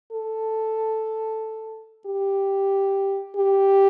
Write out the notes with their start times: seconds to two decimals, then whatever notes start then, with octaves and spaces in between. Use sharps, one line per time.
0.12 A4
2.06 G4
3.37 G4